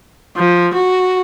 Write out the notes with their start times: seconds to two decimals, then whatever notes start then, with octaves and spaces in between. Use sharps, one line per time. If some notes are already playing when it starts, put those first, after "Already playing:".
0.37 F3
0.74 F#4